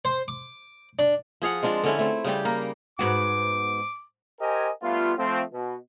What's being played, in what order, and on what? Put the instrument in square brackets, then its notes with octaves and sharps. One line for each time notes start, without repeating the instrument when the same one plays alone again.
[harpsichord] C5
D6
D4
[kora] F3 G#4 F5 F#5
G#3 C4 D4 F4
D3 C#4 E4
A3 C4
C#3 G3 G4
A#3 A#4
[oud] G#2 B3 F#4 [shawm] D6
[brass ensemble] G4 A#4 C5 D#5 G5 G#5
G3 A3 B3 F4
F3 A3 C4
B2